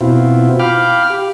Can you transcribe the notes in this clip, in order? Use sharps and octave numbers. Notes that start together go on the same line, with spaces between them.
B2 C4 E4 F4
F5 G5 B5 D6 F6
G4